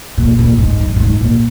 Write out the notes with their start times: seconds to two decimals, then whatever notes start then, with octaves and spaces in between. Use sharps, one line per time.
0.18 A#2
0.39 A#2
0.58 G#2
0.80 F#2
0.96 A#2
1.00 G#2
1.21 A#2